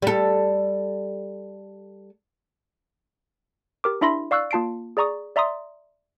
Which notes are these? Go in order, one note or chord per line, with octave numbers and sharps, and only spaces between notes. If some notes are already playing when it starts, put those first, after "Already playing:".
G3 A4
G4 A#4 D6
D4 E4 E5 B5 C6 A#6
D5 F5 C#6 E6 F#6
A#3 F4 A5 C7 D7
G#4 D5 A#5 C#6 D#6
D5 E5 A#5 C6 D#6